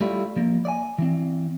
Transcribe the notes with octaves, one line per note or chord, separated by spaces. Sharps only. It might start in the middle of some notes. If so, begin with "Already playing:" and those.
G3 A3 E4 F4
F3 A#3
D5 G#5
E3 C4